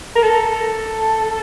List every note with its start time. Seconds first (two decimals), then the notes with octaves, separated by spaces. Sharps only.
0.16 A#4
0.23 A4